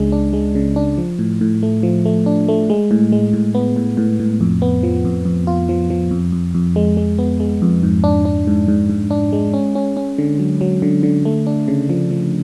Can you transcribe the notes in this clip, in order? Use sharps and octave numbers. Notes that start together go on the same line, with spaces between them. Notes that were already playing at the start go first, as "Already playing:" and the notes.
Already playing: C#2 C#3 G#3 D4
D4
G#3
C#3
D4
F3
A2
A2
A3
F3
A3
D4
A3
G#3
A2
G#3
A2
B3
A2
A2
A2
F2
B3
F3
F2
F2
F4
F3
F3
F2
F2
F2
G#3
G#3
B3
G#3
F2
G#2
D4
D4
G#2
G#2
G#2
D4
G#3
C#4
C#4
C#4
D3
F#3
F#3
D3
D3
A3
D4
C#3
F3
F3